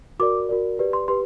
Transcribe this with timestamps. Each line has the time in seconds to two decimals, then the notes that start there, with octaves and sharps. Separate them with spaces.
0.19 F#4 A#4 D5 D6
0.49 F#4 A#4 D5
0.79 G4 B4 D5
0.93 C6
1.08 G4 B4 C6